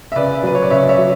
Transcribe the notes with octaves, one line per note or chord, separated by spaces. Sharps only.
E5
C#3 B4 D5
F#3 B4
C#5
D5
C#3 C#5 E5
C#5 E5
F#3